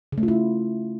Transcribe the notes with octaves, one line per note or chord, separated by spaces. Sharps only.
C#3
A3
F4
E4